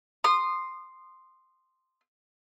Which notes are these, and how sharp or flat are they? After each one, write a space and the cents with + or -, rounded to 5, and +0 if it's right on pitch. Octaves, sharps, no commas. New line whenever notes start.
C6 +0 D#6 -25